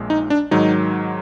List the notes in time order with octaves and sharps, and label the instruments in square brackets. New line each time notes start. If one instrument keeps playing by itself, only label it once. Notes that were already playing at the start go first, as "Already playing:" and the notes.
Already playing: [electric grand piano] A#1 A#2 G#3
D#4
D4
G#2 D#3 F#3 D#4